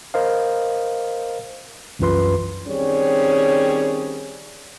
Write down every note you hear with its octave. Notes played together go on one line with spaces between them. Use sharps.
A#4 C5 D#5 F5
C2 F#2 E3 F4 B4 C6
D#3 G3 C4 C#4 G#4 C#5